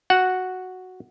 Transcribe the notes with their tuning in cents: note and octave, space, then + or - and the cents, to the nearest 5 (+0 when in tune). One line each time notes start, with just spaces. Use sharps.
F#4 +0 F#5 +0